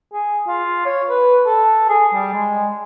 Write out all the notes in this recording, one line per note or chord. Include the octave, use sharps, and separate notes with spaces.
G#4
F4
C#5
B4
A4
G#4
G3
G#3